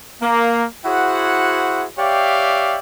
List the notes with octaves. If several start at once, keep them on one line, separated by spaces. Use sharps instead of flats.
A#3
E4 F#4 G#4 C5 F#5
G4 C#5 D5 E5 F5 G5